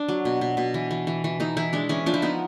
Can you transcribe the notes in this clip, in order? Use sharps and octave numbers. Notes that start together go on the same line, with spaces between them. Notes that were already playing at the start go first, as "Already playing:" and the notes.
Already playing: D4
F#3
B2
B2
B2
E3
E3
E3
E3
E3 D#4
E3 E4
G#3 D4
E3 C#4
F3 D4
E4
B3 D#4